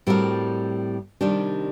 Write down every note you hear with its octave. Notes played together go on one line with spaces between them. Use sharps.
A2 G3 C4 F#4 A#4
C3 D#3 G3 D4 G4